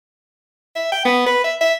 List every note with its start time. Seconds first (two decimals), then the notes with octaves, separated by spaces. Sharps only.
0.75 E5
0.92 G5
1.05 B3
1.26 B4
1.44 E5
1.61 E5